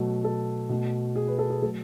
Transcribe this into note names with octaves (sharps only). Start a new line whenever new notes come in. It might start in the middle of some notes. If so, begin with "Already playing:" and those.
Already playing: B2 F#3 A3
A4
B2 A3
G#4
B4
A4
G#4
F#3 A3 A4